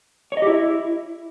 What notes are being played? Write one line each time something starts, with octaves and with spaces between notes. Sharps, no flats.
C#5
D#5
G4
E4